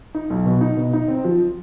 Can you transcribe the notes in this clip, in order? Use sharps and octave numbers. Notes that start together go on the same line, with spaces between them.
D#4
B1
B2
D#4
B2
D#4
C4
F3